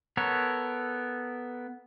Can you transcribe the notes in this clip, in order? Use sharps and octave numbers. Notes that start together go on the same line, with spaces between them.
B3 A4 A#4 C#5